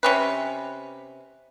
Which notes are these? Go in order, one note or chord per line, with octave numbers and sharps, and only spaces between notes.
C3 C#4 B4